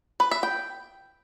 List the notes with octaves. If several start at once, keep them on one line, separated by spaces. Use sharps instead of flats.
B4
E5
G5